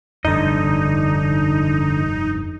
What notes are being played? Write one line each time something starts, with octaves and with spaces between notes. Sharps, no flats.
F1 G2 D3 D#4 D#5